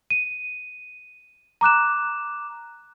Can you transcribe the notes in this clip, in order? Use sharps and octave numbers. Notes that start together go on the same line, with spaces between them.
D#7
A#5 D6 F#6 E7